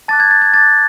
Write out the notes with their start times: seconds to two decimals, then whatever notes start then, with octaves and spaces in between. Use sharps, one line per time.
0.08 A5 D6 F#6 A6
0.20 G#6
0.31 A6
0.42 G#6
0.53 A5 D6 F#6 A6